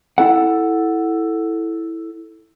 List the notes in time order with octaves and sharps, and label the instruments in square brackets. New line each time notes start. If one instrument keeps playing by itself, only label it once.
[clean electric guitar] E4 A4 F#5